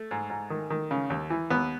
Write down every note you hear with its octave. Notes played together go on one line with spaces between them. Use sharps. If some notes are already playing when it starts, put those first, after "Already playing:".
Already playing: A3
G#2
G#2
D#3
D#3
C#3
D#2
E3
D#2 B3